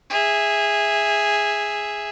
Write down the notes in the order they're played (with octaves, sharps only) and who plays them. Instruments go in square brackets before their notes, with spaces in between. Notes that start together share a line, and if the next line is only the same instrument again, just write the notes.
[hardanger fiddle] G#4 E5